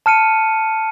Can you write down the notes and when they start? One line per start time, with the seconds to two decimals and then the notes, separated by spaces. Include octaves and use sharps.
0.06 A5 F6 C#7 D#7